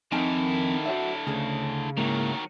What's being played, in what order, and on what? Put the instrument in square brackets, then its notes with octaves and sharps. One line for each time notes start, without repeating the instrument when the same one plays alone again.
[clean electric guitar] F2 C4 G#5 [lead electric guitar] D3 E4 [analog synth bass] D#3
[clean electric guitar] F#4 C#5 E5
[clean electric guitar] D2 [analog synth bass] C#3
[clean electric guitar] G#2 A#3 E4 [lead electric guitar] D#3 F#3